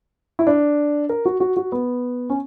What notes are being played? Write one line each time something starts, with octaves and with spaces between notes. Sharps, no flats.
E4
D4
A#4
F#4
F#4
F#4
B3
C#4